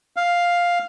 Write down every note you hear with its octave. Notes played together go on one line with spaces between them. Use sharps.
F5